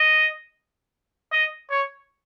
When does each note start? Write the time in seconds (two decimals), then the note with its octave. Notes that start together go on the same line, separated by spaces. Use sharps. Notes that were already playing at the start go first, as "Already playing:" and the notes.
Already playing: D#5
1.32 D#5
1.70 C#5